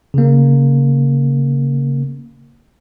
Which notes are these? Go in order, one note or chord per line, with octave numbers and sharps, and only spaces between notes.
C#3 A#3